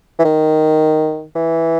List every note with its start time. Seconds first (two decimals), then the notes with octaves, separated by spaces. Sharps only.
0.19 E3
0.25 D#3
1.36 E3